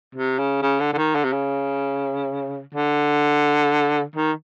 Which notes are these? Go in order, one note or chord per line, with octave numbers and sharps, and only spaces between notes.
C3
C#3
C#3
D3
D3
D#3
D3
C3
C#3
D3
D#3